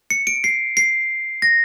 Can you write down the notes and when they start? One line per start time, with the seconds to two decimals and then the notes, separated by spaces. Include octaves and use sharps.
0.10 C#7
0.27 D7
0.44 C7
0.77 C7
1.42 A#6